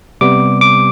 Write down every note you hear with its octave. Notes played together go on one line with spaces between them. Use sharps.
C3 G3 B3 D6
D6